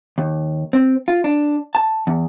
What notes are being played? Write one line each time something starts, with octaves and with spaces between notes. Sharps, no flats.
D#2
C4
F4
D4
A5
E2